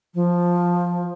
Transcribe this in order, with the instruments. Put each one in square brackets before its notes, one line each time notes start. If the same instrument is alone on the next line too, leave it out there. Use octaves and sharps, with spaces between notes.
[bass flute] F3